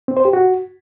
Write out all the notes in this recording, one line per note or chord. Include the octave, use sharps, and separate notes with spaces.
C4
C5
G4
F#4